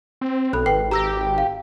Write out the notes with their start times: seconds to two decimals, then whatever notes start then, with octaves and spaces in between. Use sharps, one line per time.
0.21 C4
0.53 B1 A4 B5 F#6
0.66 G#1 B4 G5 C7
0.91 G4 A#5 E6 A#6
1.38 F5